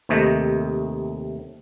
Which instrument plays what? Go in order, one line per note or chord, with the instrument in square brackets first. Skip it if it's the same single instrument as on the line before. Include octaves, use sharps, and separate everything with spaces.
[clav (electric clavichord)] D#2 C3 A3 D#5